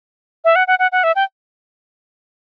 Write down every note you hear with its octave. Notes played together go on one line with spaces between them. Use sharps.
E5
F#5
F#5
F#5
F#5
E5
G5